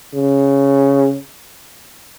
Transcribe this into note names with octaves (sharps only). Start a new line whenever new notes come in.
C#3